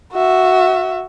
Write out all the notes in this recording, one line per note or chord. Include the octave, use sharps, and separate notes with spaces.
F#4 E5